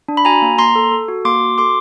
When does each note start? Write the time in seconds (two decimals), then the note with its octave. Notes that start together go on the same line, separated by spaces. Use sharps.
0.08 D4
0.17 B5
0.25 F#4 G#5 A#5
0.42 A#3
0.58 A#3 A#5 C6
0.75 A4
0.92 A4
1.08 F#4
1.25 A#3 C6 D6
1.41 F#4
1.58 A4 C6 D6